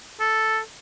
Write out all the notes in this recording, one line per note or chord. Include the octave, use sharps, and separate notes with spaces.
A4